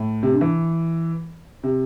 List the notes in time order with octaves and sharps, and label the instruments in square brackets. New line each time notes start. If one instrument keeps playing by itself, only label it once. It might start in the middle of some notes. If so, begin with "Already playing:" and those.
Already playing: [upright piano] A2
C3
D3
E3
C3